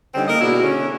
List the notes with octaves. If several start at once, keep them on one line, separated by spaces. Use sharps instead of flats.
D3 G3 C4 C#4 D#4
A#3 A#4 D#5
B2 D4 E4 F#4 G#4
D3 C#4